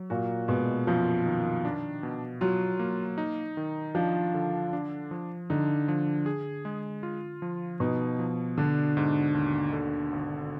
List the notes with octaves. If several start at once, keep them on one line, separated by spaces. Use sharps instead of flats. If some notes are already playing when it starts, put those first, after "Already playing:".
Already playing: F#3
A#2 F#4
B2 G#3
F#2 F3
D#3
D4
B2
F#3 F4
A#3
D#4
D#3
F3 D4
D3
D4
F3
D3 D#4
F3
G#4
G#3
F4
F3
B2 D#4
F3
D3 D4
G#2
D#2
D3
G#1